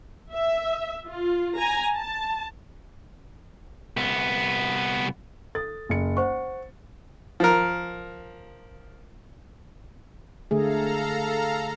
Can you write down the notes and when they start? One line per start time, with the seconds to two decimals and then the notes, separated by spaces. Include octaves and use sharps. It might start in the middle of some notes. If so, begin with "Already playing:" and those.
0.33 E5
1.06 F4
1.58 G#5 A#5
1.96 A5
3.97 C2 B3
5.55 A4 D#6 A6
5.89 F#1 C#7
6.17 C5 F#5 C#6
7.40 F3 A#4
10.51 D3 A3 G#4 A4 F5 A#5